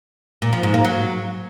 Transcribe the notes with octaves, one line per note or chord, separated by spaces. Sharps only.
A#2
F3
G#2
A#3
F#3